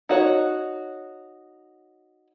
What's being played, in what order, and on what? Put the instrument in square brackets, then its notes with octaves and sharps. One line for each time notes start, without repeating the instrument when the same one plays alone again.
[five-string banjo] D#4 F#4 C#5